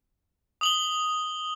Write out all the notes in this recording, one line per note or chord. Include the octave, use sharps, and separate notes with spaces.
D#6 F#7 G7